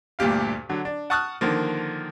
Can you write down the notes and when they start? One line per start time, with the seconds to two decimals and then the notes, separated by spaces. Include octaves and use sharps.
0.19 D2 G2 A#2 G4 F5
0.69 D3 F#3
0.85 D4
1.10 F#5 A5 C#6 D#6 F6 F#6
1.41 D3 D#3 F3 A#3